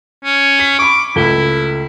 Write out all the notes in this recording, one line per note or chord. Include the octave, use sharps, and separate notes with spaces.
C#4
B6
B5 C#6 D6
C#2 A3 E4 G7